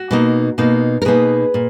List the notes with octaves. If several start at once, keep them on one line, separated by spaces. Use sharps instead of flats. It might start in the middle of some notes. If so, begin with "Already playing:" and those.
Already playing: F#4
B2 A#3 D#4
B2 A#3 D#4
A#4
B2 A#3 D#4 G#4 B4
A#2